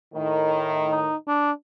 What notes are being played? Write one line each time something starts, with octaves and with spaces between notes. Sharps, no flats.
A2 D#3
D#4
D4